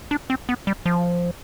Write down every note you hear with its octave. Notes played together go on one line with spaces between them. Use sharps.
D4
C4
B3
G3
F3